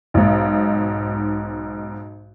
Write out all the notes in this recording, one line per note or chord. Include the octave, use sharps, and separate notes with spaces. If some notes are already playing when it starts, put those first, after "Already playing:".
B1 G#2